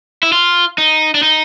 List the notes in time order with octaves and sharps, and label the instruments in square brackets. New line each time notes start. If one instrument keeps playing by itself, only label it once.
[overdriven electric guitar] E4
F4
D#4
D4
D#4